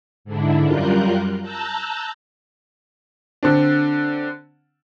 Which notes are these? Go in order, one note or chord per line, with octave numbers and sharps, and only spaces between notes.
G#2 D3 D4 E4
F#2 G3 F4 A#4 F#6 G6
A5 A#5 E6 F#6 G6 A6
D3 C4 D4